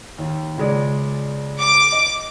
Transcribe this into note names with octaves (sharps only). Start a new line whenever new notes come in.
D#2
C#2 G#3 D5
D6
D#5